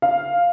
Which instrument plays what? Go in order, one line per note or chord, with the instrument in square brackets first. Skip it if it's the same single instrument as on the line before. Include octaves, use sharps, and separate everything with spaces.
[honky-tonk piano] F5